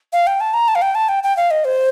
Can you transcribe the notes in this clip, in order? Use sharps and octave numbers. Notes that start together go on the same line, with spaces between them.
F5
G5
A5
A#5
A5
F5
G5
A5
G5
G5
F5
D#5
C5